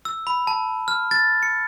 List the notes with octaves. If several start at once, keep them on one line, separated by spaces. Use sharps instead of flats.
E6
B5
A5
F6
A6
C#7